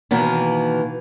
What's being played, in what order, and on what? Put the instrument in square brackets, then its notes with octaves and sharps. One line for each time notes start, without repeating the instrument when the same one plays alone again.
[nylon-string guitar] B2 D#3 E3 A#3 B3